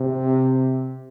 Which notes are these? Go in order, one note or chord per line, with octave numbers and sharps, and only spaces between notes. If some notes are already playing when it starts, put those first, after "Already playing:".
Already playing: C3